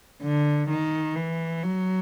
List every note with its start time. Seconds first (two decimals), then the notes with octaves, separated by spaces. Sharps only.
0.23 D3
0.70 D#3
1.16 E3
1.63 F#3